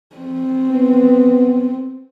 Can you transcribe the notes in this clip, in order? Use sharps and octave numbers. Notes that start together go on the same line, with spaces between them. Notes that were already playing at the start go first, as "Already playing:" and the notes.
C4
B3